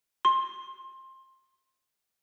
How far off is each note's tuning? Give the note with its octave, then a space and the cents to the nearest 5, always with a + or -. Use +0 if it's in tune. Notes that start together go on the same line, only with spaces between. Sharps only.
C6 +20